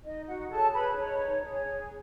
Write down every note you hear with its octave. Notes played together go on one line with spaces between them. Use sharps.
D#4 D#5
F#4 F#5
G#4 A4 C#5 A5
B4 B5
D#4 C#5
G#4 C#5